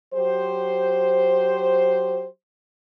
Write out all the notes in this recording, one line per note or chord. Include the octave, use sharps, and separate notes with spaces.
F#3 G4 C5